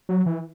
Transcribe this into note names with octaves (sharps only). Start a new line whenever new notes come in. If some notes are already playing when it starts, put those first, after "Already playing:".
F#3
E3